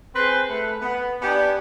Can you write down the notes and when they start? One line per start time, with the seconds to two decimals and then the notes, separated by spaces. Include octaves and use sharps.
0.14 C4 G#4 B4 C6
0.49 A3 B4
0.82 B3
1.22 B3 D4 G4 G#5